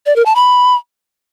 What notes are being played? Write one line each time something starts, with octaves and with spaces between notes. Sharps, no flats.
D5
A#4
A5
B5